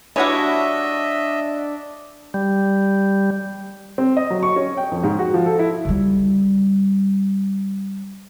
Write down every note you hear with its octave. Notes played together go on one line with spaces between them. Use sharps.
E3 G3 D4 E4 F#4 C#5 D#5 E5
G3
C4
D#5
F#3
C#6
C#4
G5
F2
G#2
F#4
F3
A4
E4
C#3 G3